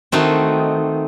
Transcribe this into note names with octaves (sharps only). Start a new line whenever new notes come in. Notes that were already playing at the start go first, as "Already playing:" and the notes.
D#3 A3 C4 D#4 F#4